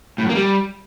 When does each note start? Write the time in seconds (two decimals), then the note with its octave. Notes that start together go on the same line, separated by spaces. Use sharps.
0.18 A2
0.24 F#2
0.30 A#3
0.35 G3